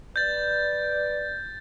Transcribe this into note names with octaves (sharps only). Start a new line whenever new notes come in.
B4 D5 G6 A6